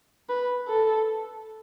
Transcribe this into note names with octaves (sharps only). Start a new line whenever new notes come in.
B4
A4